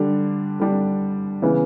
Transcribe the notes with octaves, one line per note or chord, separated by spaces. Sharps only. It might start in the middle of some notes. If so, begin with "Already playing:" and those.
Already playing: D3 G3 D4
D3 G3 D4
C#3 E3 B3